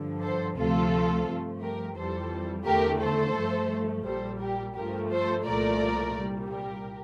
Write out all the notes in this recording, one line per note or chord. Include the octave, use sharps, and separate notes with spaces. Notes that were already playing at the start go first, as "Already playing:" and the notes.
Already playing: G2 D3 F3
A4 C5
D2 C3 F3 A3 F4 A4
G2 F3 A3
G4 A#4
F2 E3 G3 A4 C5
E2 D3 A3 G4 A#4
A4 C5
G2 F3 A3
A#1 A#2 G3 A4 C5
G4 A#4
G2 F3 A3 G4 A#4
A4 C5
C2 A#2 F3 A3 A#4 D5
C2 A#2 G3
G4 A#4